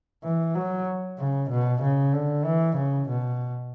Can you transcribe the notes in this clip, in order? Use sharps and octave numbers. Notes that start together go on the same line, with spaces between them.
E3
F#3
C#3
B2
C#3
D3
E3
C#3
B2